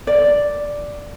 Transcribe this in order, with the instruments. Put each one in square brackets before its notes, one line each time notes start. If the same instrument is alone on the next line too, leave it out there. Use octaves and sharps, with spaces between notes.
[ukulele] D5